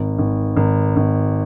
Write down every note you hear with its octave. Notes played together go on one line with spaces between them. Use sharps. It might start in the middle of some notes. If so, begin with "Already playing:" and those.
Already playing: G#1
G#1
G#1
G#1